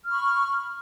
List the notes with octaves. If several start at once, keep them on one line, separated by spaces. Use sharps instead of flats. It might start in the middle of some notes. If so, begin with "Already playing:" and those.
B5 C#6 F6